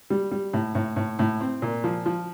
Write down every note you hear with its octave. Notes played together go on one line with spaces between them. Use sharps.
G3
G3
A2
A2
A2
A2
C4
A#2
F3
F3